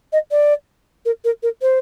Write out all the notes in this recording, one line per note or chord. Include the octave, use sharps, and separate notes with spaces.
D#5
D5
A#4
A#4
A#4
C5